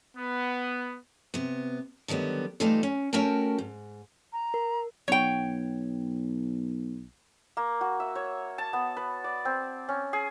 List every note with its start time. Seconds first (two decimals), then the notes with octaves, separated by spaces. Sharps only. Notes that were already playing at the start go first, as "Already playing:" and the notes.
0.16 B3
1.34 C3 B3
2.08 D3 D#3 F#3 G3 B3
2.60 E3 G3 A3 D#4 F4 A4
2.83 C#4
3.13 A3 C#4 F#4 A#4 G5 A5
3.58 G#2
4.33 A#5
4.54 A#4
5.08 B1 C#5 G5
7.57 A#3
7.81 F#4
8.00 E5
8.15 C#5
8.58 A5
8.73 B3
8.97 B4
9.24 D5
9.45 C4
9.89 C#4
10.13 G#4